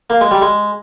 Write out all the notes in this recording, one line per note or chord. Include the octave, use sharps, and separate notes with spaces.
A#3
G#3
G3
G#3